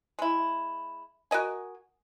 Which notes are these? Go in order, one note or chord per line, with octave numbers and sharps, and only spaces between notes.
G#3 E4
F#4 A#4 D#5 G#5